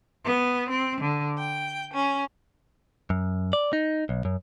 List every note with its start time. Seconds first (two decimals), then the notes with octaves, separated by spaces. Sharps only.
0.24 B3
0.68 C4
0.99 D3
1.38 G5
1.92 C#4
3.10 F#2
3.53 D5
3.73 D#4
4.09 B1
4.25 F#2